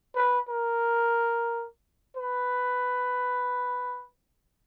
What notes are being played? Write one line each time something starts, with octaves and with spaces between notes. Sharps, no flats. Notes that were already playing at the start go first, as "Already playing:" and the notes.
B4
A#4
B4